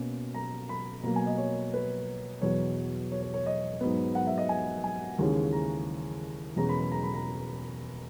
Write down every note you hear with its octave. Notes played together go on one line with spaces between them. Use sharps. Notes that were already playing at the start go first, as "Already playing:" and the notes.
Already playing: B2 A#3 C#4
A#5
B5
B2 F#3 A#3 A#5
G#5
D#5
C#5
B4
E2 B2 F#3 C#5
C#5
C#5
C#5
D#5
G#2 F#3 B3
F#5
E5
D#5
G#5
G#5
D#2 C#3 E3 G#3 C#4
A#5
E2 B2 G#3 C#4 A#5
B5
B5
A#5
B5
A#5